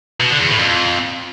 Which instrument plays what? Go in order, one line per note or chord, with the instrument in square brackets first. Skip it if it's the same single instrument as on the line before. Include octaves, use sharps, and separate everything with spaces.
[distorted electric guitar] B2
D3
E2
A2
F2